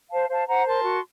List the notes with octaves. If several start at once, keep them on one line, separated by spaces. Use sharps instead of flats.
C5 F5 A5
C5 F5 A5
C5 F#5 A#5
A#4 A5 C6
F#4